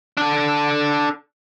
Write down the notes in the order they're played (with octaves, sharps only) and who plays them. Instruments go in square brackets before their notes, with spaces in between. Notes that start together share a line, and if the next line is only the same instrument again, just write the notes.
[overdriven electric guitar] D4 A4